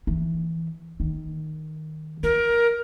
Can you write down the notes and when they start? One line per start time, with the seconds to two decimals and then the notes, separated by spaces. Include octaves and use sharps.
0.07 E3
1.00 D#3
2.23 F4 A#4